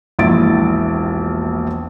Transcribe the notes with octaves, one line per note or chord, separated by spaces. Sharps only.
E1 A#1 E4 E5 A6 D7